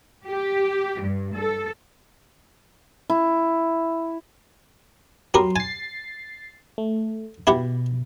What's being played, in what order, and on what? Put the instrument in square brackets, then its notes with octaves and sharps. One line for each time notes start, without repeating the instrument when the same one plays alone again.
[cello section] G4
G2
A4
[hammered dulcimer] E4
[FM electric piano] F#3 C6 [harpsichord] B3 G4 A#4
[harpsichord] G#5 [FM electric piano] A6 C7
[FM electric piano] A3
[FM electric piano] B2 [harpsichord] E4 G4 F#5